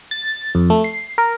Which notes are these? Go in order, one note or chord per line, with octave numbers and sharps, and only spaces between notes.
A6
F2
A3
C7
A#4